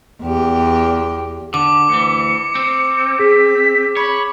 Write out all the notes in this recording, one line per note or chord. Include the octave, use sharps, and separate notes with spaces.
E2 G4
D3 D6
D2 E3 C#7
C4
G#4 B6
C#5 B5